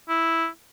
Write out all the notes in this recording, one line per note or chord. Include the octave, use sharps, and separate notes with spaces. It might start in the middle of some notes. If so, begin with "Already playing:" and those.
E4